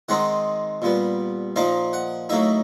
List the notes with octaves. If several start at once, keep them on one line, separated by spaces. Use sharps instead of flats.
D#3 G#3 C4 D#4 F#5
A#2 G3 B3
A#2 F3 A#3 D#4 F5
F#5
A2 F#3 A#3 D#4 E5